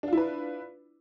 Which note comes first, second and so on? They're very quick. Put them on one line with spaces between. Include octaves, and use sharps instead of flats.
D4 F4 E4 B4